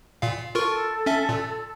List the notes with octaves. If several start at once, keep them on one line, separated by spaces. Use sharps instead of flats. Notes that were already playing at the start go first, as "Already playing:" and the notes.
A#2 F5
F4 A4 A#4 C#6
C#4 E5
A#2